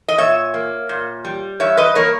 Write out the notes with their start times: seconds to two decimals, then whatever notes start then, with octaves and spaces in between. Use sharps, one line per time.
0.08 D#5
0.18 A#2 C#5 E5
0.54 A#3
0.89 A#2
1.25 G3
1.60 G2 C#5 E5
1.77 B4 D#5
1.95 A#3 A#4 C#5